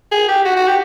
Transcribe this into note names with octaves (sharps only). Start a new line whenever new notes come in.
G#4
G4
F#4
F#4
G4